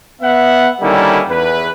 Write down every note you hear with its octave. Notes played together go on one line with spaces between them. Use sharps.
B3 E5 F#5
D3 D#3 G3 A#3 C#4 E4
E2 B4